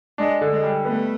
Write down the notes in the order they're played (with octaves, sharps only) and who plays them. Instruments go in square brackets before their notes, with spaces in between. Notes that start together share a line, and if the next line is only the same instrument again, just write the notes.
[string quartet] G#3 [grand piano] D4
[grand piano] D3
[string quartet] G#3
[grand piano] G3
[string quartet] A3 [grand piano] B3